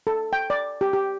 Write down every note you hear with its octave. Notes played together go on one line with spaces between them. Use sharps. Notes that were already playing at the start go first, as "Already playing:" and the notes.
A4
G5
D5
G4
G4